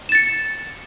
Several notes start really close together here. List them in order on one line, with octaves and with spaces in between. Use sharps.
E7 A6 C#7